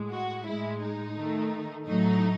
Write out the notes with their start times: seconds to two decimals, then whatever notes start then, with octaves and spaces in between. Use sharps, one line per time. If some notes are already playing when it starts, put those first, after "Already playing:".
Already playing: A2 G#3
0.12 F#4
0.47 A2 G#3 E4
0.81 D#4
1.16 D#3 A3
1.85 A2 F#3 A3 D#4